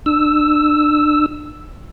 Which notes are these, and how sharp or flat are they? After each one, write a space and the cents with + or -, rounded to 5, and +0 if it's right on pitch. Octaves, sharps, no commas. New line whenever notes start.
D4 +30 E6 +0